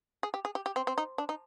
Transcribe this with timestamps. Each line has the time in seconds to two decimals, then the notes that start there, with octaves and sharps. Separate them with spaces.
0.23 G#4
0.34 G4
0.45 G#4
0.55 G4
0.66 G4
0.76 C4
0.87 C4
0.98 D#4
1.18 D4
1.29 D#4